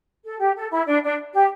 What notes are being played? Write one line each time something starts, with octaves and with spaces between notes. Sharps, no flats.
A4
G4
A4
E4
D4
D4
G4